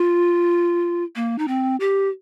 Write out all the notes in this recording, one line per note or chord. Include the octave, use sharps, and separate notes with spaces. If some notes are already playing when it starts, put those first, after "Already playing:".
Already playing: F4
A#3
D#4
C4
G4